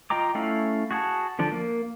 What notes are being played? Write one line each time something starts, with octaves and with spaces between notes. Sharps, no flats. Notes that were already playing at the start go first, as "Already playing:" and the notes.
F4 D#5 G5 A#5 D6
A3 C#4 E4 F5
F#4 G#4 F#5 A5
D3 F3 D4
A#3